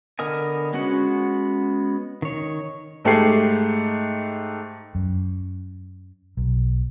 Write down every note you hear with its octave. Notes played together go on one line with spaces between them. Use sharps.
D3 B3 A#4 D#5 G#5
G#3 B3 C#4 F#4 F#5
D#3 C#5
G#2 A3 G4 G#4 C7
F#2
B1